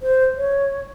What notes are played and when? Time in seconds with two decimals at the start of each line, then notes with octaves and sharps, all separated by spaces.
0.02 C5
0.37 C#5